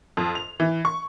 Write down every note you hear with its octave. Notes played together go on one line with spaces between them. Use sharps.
F2
F7
E3
C#6